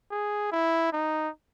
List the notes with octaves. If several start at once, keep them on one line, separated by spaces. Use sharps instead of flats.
G#4
E4
D#4